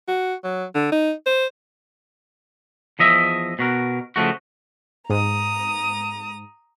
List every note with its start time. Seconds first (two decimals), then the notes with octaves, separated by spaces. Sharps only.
0.08 F#4
0.44 F#3
0.75 D3
0.92 D#4
1.26 C5
2.99 E2 F3 D#5 E5
3.59 B2 F#4 A#4
4.16 C#3 F3 A3 F#4
5.10 G#2 A#5 D#6